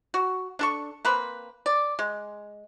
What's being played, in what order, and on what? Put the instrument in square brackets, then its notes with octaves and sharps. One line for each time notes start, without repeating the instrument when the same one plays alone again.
[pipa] F#4
D4 A4 C#6
A#3 C4 B4
D5
G#3